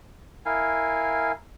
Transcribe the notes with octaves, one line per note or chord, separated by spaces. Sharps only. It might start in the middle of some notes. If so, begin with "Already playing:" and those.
E4 A#4 F5 G#5